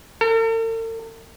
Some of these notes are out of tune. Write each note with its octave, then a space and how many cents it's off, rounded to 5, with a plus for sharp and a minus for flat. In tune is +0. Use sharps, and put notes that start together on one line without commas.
A4 +45